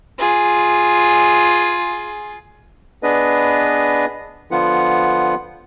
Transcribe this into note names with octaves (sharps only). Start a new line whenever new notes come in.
F4 G#4
B3 D4 G#4 B4 D#5
D3 F3 B3 F4 F#5